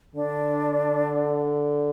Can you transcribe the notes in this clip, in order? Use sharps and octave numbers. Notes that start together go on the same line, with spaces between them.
D3 D4